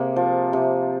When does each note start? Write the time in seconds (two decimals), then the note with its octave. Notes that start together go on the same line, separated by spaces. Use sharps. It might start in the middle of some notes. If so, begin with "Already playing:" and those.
Already playing: C3 A#3 G#4
0.16 F3
0.53 C3